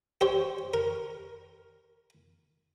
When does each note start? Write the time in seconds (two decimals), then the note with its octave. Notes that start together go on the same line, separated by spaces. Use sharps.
0.21 G4 C5 C#5
0.74 A#4